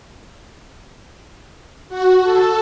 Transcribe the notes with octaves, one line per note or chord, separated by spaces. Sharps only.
F#4
A4